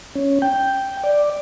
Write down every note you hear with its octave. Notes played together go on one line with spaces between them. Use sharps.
C#4
G5
D5